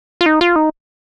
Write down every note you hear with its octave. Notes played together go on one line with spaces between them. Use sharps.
F4
D#4
F4
D#4